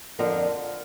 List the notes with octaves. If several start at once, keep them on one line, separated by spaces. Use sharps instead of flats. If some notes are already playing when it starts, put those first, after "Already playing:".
F2 D3 F3 A#4